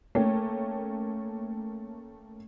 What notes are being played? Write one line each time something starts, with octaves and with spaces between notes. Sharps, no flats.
A3 A#3 C#4 C#5 G5